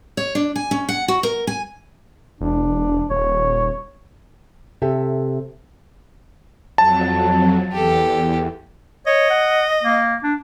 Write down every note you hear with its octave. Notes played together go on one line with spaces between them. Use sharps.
C#5
D4
G#5
C#4
F#5
F#4
A#4
G#5
E1 D4
D#1 C#5
C3 G4 A4 E5
F2 F#3 A5
E2 G4 A4
C#5 D#5
F#5
A#3
D4